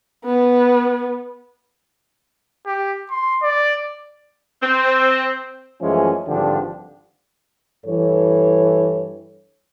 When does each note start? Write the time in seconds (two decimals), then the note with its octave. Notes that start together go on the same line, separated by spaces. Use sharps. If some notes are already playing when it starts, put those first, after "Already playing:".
0.24 B3
2.66 G4
3.11 C6
3.43 D5
4.62 C4
5.81 F#2 E3 F3 G#3 A3 C#4
6.28 G#1 G2 D3 F3 D4 G4
7.85 G2 E3 A4 C#5